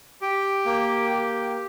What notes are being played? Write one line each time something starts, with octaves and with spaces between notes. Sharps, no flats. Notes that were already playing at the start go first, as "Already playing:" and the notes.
G4 G5
A#3
G4